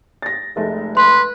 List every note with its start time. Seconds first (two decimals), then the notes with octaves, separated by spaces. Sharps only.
0.22 A6 A#6
0.56 F1 G#3 A3
0.97 B4 C6